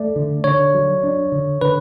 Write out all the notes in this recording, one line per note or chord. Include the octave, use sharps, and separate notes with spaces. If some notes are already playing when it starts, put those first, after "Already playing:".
Already playing: A3 D5
D3
D3 C#5
F#3
D4
D3
D3 B4